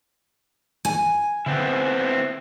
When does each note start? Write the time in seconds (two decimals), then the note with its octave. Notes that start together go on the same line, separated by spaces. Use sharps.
0.85 G#5
1.46 D3 B3 C4 E4